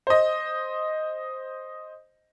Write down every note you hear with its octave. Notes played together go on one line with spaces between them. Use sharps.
C5 D#5